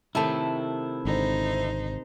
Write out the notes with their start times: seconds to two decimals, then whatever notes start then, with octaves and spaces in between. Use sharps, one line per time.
0.15 C3 D#3 A3 E4 A5
1.05 G#1 D3 D#4 C5